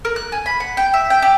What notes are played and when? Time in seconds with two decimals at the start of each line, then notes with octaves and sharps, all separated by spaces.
0.05 A#4
0.16 F#6
0.32 G#5
0.46 B5
0.60 F#5
0.77 G5
0.94 E5
1.10 G5
1.22 G4